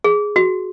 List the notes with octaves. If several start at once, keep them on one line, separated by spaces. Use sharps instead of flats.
G#4
F#4